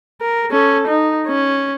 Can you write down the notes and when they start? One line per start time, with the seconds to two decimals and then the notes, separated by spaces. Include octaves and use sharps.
0.21 A#4
0.51 C#4 A4
0.87 D#4
1.27 C#4